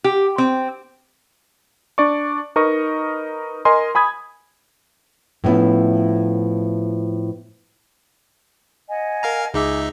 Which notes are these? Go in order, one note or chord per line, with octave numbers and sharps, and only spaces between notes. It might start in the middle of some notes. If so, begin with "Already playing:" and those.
G4
C4
D4 D5 C#6
D#4 A#4 B4 D#5 C#6
A#4 D#5 G#5 C6
G#5 B5 D#6 G#6
A2 F3 B3 C#4 E4
D#5 F#5 G#5
A#4 F5 A#5
C#2 D#4 G#4 E5 D6